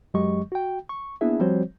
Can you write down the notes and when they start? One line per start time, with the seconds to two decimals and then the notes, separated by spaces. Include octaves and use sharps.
0.14 F#2 F#3 G#3 G4 D#5 C#6
0.52 F#4 G5
0.89 C#6
1.21 A#3 B3 D4 E4 G#4 E5
1.40 F3 G3 C4 F#4 C5 C#5